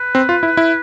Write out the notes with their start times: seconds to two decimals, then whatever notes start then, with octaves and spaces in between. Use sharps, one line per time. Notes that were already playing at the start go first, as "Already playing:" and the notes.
Already playing: B4
0.15 C4
0.29 F4
0.43 E4
0.57 E4